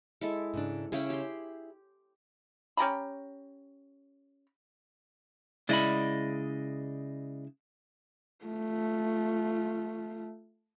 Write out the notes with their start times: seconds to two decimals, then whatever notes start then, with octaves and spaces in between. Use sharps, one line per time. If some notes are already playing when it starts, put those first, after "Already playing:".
0.21 G#3 E4 A4
0.54 G#2 C#3 D4
0.92 C#3 C#4 E4 G#4 G5
1.10 G4 C6
2.77 C#4 G4 A#5 B5
5.69 C#3 G#3 E4 D5 D#5 B5
8.45 A3 F4